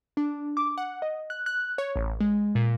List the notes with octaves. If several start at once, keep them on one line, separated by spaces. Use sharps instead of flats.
D4
D6
F#5
D#5
F#6
F#6
C#5
A1
G#3
A#2